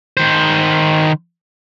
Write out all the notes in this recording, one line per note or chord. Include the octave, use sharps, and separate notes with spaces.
D#3 C5